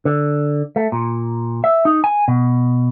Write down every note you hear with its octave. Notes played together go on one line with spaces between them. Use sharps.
D3
A3
A#2
E5
D#4
G#5
B2